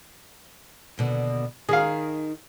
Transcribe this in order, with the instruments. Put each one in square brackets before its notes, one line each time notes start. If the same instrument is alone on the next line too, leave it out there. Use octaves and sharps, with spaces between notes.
[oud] D#2 B2 D3
[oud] D#3 D#4 [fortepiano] G#4 F5